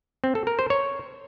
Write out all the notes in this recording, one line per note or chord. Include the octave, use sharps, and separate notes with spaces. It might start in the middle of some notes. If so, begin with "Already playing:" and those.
C4
A4
A#4
C5
C#5